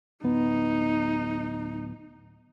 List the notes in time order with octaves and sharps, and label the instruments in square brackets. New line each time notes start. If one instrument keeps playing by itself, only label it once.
[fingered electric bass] D1 B3 [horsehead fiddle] D#4